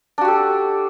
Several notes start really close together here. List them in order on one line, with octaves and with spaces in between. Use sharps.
D4 F#4 G4 A4